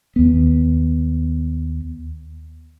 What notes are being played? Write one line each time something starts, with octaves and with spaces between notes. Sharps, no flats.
D#2 B3